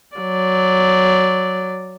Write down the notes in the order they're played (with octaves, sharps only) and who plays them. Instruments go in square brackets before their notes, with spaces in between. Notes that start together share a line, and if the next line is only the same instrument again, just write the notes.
[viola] F#3 D5